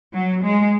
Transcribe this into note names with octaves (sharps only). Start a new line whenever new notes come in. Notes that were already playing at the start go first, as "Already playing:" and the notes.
F#3
G#3